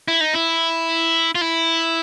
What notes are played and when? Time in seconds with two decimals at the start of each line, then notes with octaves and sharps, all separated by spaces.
0.08 E4
0.21 D#4
0.34 E4
1.35 F4
1.41 E4